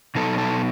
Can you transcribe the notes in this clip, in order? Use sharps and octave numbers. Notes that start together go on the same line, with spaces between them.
B2 F#3 B3 D#4 A4
A4